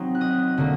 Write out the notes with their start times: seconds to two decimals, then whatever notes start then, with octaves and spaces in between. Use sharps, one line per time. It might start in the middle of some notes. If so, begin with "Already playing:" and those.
Already playing: F#3 C4 D#4
0.15 F#6
0.21 D#5 D#6
0.57 D3 F#3 A#3